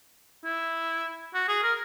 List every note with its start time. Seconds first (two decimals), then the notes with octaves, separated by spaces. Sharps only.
0.44 E4
1.34 F#4
1.48 G#4
1.63 A#4